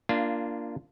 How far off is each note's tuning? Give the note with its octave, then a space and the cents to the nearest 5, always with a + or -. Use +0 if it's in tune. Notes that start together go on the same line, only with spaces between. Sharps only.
A#3 +0 D4 +0 F4 -20